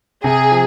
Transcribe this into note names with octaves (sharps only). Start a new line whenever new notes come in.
C3 G#4
F3